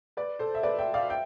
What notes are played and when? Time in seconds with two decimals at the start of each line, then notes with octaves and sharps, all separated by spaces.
0.17 B4 D5
0.39 A4 C5
0.55 E5
0.63 B4 D5
0.79 E5 G5
0.94 D5 F5
1.09 E5 G5